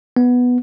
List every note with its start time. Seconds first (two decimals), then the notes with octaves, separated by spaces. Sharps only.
0.17 B3